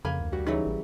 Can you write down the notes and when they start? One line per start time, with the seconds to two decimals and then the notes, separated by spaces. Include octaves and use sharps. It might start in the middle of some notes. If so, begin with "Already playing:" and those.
0.05 F2 C#3 A#3 G#5 B5
0.21 D2
0.32 G3 F#4
0.47 C#3 E3 F#3 D#4
0.66 A1